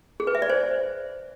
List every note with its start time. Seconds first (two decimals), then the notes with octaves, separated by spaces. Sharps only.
0.20 G#4
0.27 B4
0.35 E5
0.42 D5
0.50 C5